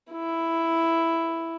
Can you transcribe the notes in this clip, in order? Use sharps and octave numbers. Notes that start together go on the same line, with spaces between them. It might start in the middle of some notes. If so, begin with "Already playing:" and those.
E4